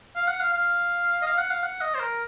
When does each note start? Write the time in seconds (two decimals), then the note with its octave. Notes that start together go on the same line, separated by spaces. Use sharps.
0.16 F5
0.28 F#5
0.40 F5
0.52 F5
1.22 D#5
1.26 F5
1.38 F#5
1.51 F5
1.63 F#5
1.81 D#5
1.95 C5
2.00 A#4